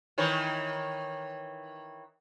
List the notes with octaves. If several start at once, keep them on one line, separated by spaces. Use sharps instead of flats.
D#3 E3 C#5